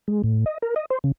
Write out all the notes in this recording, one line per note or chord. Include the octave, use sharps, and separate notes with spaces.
G#3
A2
D#5
A#4
D#5
C5
C#3